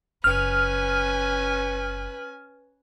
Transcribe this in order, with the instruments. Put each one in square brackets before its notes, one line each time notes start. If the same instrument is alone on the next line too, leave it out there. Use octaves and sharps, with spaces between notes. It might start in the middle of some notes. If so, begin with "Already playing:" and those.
[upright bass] F#1 [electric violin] C#4 G#5 [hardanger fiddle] B4 [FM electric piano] F6